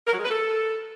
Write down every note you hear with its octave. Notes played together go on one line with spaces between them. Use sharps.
A#4
F#3
G#3
B4
A4